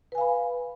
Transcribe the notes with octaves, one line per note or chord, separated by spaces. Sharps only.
B4 F5 G#5 B5